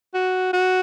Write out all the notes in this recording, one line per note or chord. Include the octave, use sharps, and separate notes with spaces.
F#4
F#4